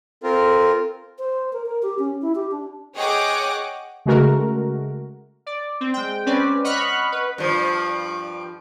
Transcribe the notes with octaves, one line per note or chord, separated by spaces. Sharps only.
C4 F4 A4 A#4
C5
A#4
A#4
G4
C#4
E4
G4
D4
G#4 C#5 D#5 F#5 G5 D6
C#3 G#3 A3 F#4 A#4
D5
C4
G#3 G5
C4 C#4 B4 D5
D#5 F#5 B5 C#6 F6 F#6
B4
G2 F3